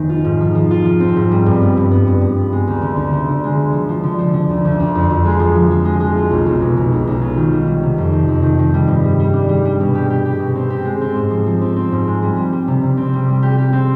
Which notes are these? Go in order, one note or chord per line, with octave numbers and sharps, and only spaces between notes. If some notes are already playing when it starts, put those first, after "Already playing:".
Already playing: F1 D#3 B3
F4
G#2
F3
F3
F4
F3
C4
G#2
G3
G2
B3
G2
B3
G2
G2
B3
G#3
D2
D3
D2
D3
D3
G#3
D3
F3
F3
D3
F3
D3
D2
D2
D2
F2
F2
G#3
F3
F3
F3
G#3
G#3
F4
B1
B1
B2
B2
B1
B1
F4
D#3
G3
G3
C3
F2
D#3
F2
D#3
D#3
G3
G2
G3
G3
D4
G3
G3
B2
G4
G4
G4
B2
C4
G4
G#3
C4
G#2
F3
F3
C4
C4
G#2
G#3
G3
G3
G3
C3
C3
C4
G3
G3
G4
G4
C4